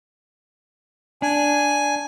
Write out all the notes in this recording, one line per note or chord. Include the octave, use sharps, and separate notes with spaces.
D4 G#5